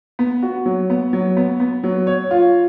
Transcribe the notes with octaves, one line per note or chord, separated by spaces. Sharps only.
B3
F#4
F#3
B3
F#3
B3
B3
F#3
C#5
F4